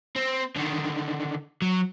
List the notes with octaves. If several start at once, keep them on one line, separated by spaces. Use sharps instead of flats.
C4
D3 D#3
F#3